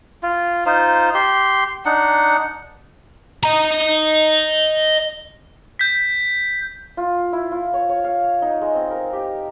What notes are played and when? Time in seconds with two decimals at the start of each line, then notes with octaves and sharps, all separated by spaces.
0.23 F4
0.66 D#4 F4 C5
1.14 G4 C6
1.85 D4 D#4 F#5
3.44 D#5 A#5
5.79 G6 B6
6.97 F4
7.33 E4
7.52 F4
7.73 C#5
7.89 C#5
8.04 F5
8.42 D#4
8.61 G#3
8.75 C4
8.91 A#4
9.13 G4